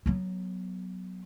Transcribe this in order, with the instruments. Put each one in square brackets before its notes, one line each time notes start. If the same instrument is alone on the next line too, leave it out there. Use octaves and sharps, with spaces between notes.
[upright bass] F#3 B3